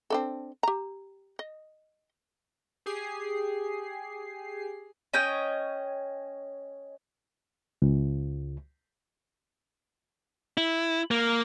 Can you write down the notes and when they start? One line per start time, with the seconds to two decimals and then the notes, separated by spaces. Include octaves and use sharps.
0.10 C4 D4 A4
0.63 G4 A#5
1.39 D#5
2.86 G4 G#4 C7
5.14 C#4 C#5 D#5 G5
7.82 C#2
10.57 E4
11.11 A#3